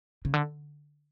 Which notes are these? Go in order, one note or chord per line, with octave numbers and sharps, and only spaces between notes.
C#3
D3